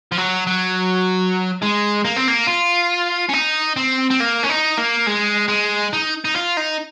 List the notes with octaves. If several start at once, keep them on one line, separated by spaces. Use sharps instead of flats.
F3
F#3
F#3
G#3
A#3
C4
A#3
F4
C#4
D#4
C4
C4
A#3
C#4
D#4
A#3
G#3
G#3
D#4
D#4
F4
D#4